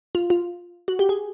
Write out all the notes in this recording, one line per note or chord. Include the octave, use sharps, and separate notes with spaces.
F4
F4
F#4
G4
G#4